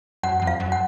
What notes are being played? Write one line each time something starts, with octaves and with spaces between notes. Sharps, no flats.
F#2 F#5
F2 F#5
F5
F#2
F#5